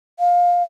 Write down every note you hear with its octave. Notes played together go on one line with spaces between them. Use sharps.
F5